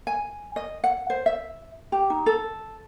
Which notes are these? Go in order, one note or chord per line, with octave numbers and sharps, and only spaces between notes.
G#5
D#5
F#5
C5
E5
G4
D#4
A4